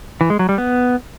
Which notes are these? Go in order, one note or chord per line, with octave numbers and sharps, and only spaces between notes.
E3
G#3
F#3
G3
B3